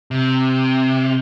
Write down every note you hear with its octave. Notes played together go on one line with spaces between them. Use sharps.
C3